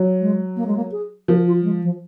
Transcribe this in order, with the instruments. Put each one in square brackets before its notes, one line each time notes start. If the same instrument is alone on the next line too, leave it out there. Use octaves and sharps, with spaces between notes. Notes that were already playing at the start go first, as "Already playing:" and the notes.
Already playing: [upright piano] F#3
[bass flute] G#3
A#3
G#3
A#3
G#4
[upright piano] F3 [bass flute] A#4
[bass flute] F4
F#3
G#3
F3